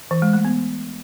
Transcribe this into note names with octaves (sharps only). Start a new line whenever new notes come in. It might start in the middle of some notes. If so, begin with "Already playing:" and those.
E3
G#3
A3
B3